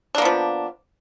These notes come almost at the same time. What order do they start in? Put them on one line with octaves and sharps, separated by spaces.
D4 A#3 B3 F3